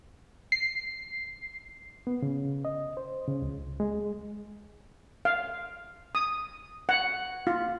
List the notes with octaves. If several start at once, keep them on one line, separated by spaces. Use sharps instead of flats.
C7
B3
C#3
D#5
C5
C#3
C#2
G#3
F5
D#6
F#5
F4